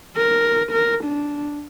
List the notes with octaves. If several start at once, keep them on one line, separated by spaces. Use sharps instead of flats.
A#4
A#4
D4